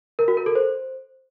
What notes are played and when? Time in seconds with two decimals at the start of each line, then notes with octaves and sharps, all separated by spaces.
0.19 A#4
0.28 F#4
0.37 A#4
0.46 A4
0.55 C5